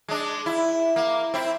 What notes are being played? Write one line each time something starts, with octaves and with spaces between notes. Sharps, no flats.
G#3 D4
E4
A#3
C4 E4